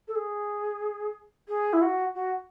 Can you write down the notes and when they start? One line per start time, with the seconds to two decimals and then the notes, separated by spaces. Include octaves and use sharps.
0.07 A4
0.15 G#4
1.48 G#4
1.73 E4
1.81 F#4
2.15 F#4